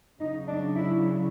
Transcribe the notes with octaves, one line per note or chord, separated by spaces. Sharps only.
C#3 F#3 D#4
D4
E4